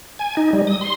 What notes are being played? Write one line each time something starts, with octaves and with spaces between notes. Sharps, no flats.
G#5
D#4
G3
D#6
C6